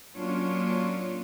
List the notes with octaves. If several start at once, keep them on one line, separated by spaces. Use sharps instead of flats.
F#3 A#3 C#4 D4 F4 C#5